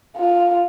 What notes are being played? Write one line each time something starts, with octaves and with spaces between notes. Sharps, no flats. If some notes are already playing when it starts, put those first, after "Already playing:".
F4